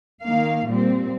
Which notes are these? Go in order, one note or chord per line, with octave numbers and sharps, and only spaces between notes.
D#3 A#3 F5
A#2 G3 C4